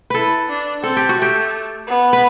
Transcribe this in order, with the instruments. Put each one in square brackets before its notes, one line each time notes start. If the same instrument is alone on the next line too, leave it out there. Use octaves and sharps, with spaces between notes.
[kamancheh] E4 [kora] A4 B4
[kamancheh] D4
[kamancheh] C4 [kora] A4
[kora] G4
F#4
[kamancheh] A3 [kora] G4
[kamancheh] B3
[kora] B4